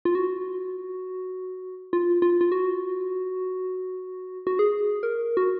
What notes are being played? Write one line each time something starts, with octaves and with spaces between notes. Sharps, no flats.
F4
F#4
F4
F4
F4
F#4
F#4
G#4
A#4
F#4